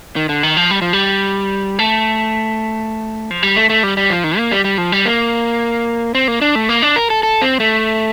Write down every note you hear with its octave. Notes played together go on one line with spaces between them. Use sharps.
D#3
D3
D#3
F3
G3
F3
G3
A3
F3
G3
A3
A3
G3
G3
F3
D#3
A#3
G3
G3
F3
G3
A#3
C4
A#3
D4
A3
A#3
D4
A#4
A4
A4
C4
A3